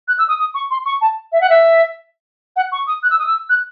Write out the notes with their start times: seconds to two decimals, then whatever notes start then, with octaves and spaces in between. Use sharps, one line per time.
0.08 F#6
0.19 E6
0.28 D#6
0.39 D#6
0.54 C#6
0.71 C6
0.85 C#6
1.01 A5
1.32 E5
1.41 F#5
1.50 E5
2.56 F#5
2.72 C#6
2.87 D#6
3.03 F#6
3.10 E6
3.19 D#6
3.26 E6
3.49 F#6